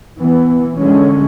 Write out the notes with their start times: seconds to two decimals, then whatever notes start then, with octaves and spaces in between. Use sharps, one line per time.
0.20 E3 B3
0.79 D3 G#3 C#4